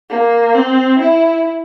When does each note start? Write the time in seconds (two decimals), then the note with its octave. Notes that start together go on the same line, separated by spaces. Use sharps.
0.10 A#3
0.54 C4
0.99 E4